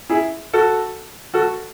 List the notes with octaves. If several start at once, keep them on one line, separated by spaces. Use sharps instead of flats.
E4 G#4
F#4 A4
F#4 A4